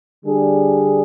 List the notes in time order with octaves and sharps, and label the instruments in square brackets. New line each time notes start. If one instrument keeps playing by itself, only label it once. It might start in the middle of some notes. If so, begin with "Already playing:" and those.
[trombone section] D3 G3 D4 G#4